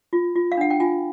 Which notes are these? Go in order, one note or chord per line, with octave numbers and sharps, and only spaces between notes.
F4
F4
F5
D4 F#5
G5
F4 G#5